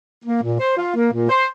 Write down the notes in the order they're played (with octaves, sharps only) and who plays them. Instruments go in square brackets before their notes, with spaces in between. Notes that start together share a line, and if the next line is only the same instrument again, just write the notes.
[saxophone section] A#3
A#2
C5
F4
A#3
A#2
C5